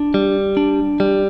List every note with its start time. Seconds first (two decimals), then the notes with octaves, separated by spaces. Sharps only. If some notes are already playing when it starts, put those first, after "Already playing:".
Already playing: D4
0.14 G3
0.57 D4
1.00 G3